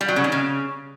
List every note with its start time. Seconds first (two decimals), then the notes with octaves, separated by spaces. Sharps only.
0.01 G3
0.08 F#3
0.16 C#3
0.24 D#3
0.32 C#3